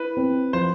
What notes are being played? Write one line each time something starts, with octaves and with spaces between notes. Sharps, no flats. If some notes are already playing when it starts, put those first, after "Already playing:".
Already playing: E4 B4
C4
F3 C5